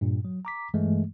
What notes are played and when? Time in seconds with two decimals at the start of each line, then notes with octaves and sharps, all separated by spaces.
0.01 G2 A#2
0.25 F#3
0.45 A#5 D6 B6
0.74 G2 E3 G#3 A3